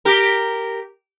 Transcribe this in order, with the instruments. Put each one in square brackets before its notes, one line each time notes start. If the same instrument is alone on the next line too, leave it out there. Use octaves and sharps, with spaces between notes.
[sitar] G4 A#4